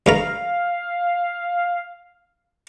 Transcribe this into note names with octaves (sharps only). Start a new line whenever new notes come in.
G2 A3 F5 A#5